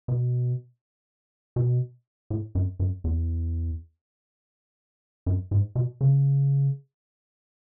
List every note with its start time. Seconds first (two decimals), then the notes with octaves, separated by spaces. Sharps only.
0.08 B2
1.56 B2
2.30 A2
2.55 F#2
2.80 F#2
3.04 E2
5.26 F#2
5.51 G#2
5.75 B2
6.01 C#3